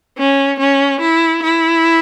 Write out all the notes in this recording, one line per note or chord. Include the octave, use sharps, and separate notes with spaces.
C#4
C#4
E4
E4